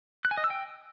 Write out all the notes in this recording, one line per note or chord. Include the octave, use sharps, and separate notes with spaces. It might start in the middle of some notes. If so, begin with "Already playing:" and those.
F#6
G#5
D#5
E6
G5